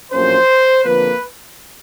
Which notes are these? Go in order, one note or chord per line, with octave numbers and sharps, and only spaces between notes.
A#1 A2 F#3 A#3 C#4 C5
F2 D3 F3 A#3 B4